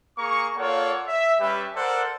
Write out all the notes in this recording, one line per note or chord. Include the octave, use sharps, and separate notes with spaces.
A#3 G#4 A#5 C#6
A#3 F4 A4 C#5 D5 F#5
E5
G3 C#4 G4 B4 E5
A4 A#4 C5 D5 F#5